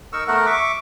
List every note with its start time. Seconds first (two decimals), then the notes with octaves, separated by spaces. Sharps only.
0.13 D#4 A#4 C#6 E6
0.27 A3 B3 A#4 F#5
0.46 E5 C#6 D6